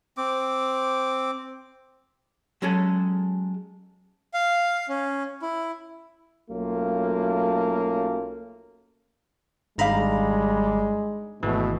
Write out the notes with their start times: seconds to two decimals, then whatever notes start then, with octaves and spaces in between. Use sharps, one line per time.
0.17 C4 D6
2.62 F#3 G#3 C#4 G#4 A4
4.34 F5
4.89 C#4
5.42 E4
6.50 B1 F#3 A3 A#3 C#4 F4
9.78 G#1 G3 G#3 D4 D#4 F5 A#5 B5
11.43 G#1 B2 E3 A3